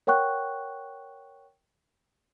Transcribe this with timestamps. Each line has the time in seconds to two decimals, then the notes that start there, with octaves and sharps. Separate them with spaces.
0.07 A#4 C#5 F#5 G5 C#6 F#6